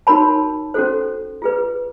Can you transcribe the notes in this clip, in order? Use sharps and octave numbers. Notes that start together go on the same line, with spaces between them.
D#4 F#4 A#4 C#5 A5 B5
C#4 F#4 A4 C5
F4 G#4 B4